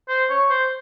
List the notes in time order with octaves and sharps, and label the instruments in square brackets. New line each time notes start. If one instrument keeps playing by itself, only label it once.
[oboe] C5
C#5
C5